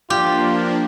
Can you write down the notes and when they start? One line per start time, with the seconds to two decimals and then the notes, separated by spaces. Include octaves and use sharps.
0.10 F3 A#3 D4 F4 G4